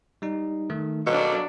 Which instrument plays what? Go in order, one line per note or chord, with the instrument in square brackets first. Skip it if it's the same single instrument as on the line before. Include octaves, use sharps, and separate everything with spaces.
[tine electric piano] G3 D#4
D#3 A3
[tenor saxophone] B2 [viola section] F#3 D4 [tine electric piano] A4 A#4 F5